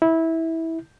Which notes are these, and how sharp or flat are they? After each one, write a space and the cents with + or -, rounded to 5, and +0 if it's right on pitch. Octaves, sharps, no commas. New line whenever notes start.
E4 -20